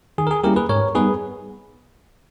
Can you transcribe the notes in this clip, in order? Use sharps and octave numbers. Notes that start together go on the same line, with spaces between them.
D#3 G#4
A#4
G#4
G3 A#3 C#4 E4 G4 A#4
G#4 B4
G#2 A#4 C#5
G3 B3 D#4 G#4 B4